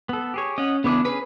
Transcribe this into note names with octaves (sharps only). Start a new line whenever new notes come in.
B3 A4
G4 G#4 C#5
C#4 D#5 F#5
C#3 E3 B3 D4 D6
C#4 G#4 B4